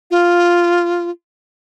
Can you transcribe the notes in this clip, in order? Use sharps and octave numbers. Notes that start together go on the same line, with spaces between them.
F4